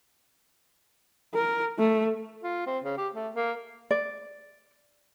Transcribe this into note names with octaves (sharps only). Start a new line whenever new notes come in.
A#4
A3
F4
C4
C#3
G4
A3
A#3
D5